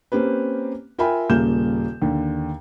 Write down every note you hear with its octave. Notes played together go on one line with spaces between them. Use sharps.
A#3 C4 C#4 G4 B4
F4 A#4 E5 G5 G#5 B5
D#1 C#3 G3 A#3 G6 E7
D#2 D3